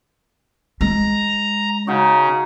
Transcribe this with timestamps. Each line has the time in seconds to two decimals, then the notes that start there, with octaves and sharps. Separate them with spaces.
0.81 G#3 A#5
1.87 C#3 D#4 F#4